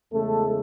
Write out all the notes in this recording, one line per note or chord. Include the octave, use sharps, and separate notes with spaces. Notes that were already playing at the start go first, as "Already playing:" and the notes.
E2 C#3 G#3 A3 A4